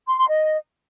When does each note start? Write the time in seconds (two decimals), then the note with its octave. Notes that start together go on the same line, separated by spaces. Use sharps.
0.08 C6
0.18 C6
0.28 D#5